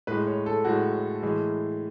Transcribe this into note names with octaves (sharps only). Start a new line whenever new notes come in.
A2 G#3 B4
C#5
A4
A2 G#3 F#4
A2 E3 G#3